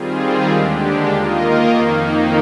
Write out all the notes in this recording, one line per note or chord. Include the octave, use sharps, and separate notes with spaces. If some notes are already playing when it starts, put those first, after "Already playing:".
Already playing: D#3 G3 C4 F4 G#4
D#2 D3 G#3 D4 G4
D#3 A#3 F4 A#4 D#5
F2 D#3 A#3 D#4